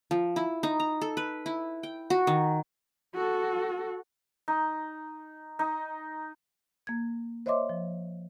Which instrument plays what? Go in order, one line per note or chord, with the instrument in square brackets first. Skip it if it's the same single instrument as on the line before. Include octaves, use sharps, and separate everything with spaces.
[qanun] F3
E4
D#4
A#5
A4
B4
E4
G5
F#4
D#3
[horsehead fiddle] F#4 A4
[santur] D#4
D#4
[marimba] A#3 G#6
C5 C#5 D#5 E5 C6 D6
F3